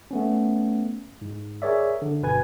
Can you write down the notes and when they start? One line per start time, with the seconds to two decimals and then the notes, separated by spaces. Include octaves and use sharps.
0.11 A3 B3 C#4
1.22 G#2
1.62 G#4 A#4 C#5 D5 E5
2.02 D3
2.22 G1 B2 B4 G#5 G#6